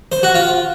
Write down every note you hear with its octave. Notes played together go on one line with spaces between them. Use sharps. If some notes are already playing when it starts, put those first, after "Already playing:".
C5
F#4
F4